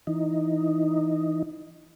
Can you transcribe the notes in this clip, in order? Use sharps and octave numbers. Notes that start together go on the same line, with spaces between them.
E3 D#4